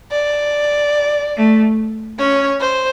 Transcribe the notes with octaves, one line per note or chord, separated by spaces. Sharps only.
D5
A3
C#4 C#5
C5